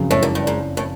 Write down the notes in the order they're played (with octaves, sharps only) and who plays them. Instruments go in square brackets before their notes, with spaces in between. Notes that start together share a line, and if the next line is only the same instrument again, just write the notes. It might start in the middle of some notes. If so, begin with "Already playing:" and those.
Already playing: [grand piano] F#1 F2 C#3 F#3
[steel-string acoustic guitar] A2
G#2
G2
G#2
A2